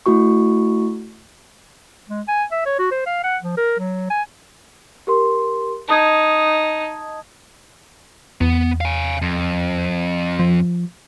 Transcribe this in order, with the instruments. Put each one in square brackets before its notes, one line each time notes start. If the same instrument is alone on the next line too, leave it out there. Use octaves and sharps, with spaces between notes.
[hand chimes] A3 E4 F#4 C#6
[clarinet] G#3
G#5
E5
C#5
F#4
C5
F5
F#5
F3
A#4
F#3
G#5
[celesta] G4 A#4 C6
[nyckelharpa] D#4 [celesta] A5 D#6 G#6
[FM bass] E2 [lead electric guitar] B3
[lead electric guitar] F5 G#5
F2
[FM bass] F3